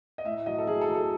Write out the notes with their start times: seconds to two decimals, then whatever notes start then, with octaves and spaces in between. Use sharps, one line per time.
0.18 D#5
0.25 A2 E5
0.46 F#3 D#5
0.59 A4
0.67 F#3 G#4
0.81 A4
0.88 F#3
0.95 A4